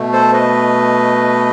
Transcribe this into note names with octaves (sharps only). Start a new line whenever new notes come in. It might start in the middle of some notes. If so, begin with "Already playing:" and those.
Already playing: B2 A3
A4 C5
B4 D#5